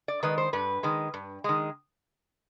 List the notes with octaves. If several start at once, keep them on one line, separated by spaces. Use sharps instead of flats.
D5
D#3 G#3 B4
C5
G2 B4
D#3 G#3
G2
D#3 G#3